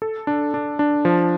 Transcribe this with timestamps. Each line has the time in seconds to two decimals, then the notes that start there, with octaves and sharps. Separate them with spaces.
0.02 A4
0.27 D4
0.54 D4
0.79 D4
1.05 F3